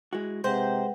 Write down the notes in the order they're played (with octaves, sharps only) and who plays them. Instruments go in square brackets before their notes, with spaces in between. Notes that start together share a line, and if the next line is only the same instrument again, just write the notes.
[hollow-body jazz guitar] G#3 E4 F#4
[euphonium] C3 [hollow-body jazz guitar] G#3 [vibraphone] B4 F#5 G5 [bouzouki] C5